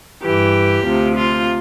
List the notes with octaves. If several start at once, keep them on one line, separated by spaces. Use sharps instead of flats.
G2 E3 G4
D2 C3 F3
F4